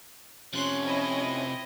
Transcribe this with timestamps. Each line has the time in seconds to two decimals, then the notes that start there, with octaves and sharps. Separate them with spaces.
0.53 C3 F3 C#4 C6 F#6
0.84 C4 E4 D#5